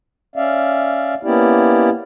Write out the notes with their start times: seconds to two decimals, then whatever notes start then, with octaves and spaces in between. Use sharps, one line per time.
0.36 C#4 D5 E5 F5
1.23 A#3 B3 C#4 E4 G4 D5